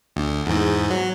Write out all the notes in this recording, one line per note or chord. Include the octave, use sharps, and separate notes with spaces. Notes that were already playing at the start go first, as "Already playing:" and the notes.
D2
E2 G#2
F#3